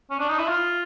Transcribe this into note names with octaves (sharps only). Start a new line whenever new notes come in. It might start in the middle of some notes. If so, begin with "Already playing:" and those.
C#4
D4
D#4
E4
F4